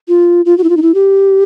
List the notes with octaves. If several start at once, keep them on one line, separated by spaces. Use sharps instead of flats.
F4
F4
F#4
E4
F4
D#4
E4
G4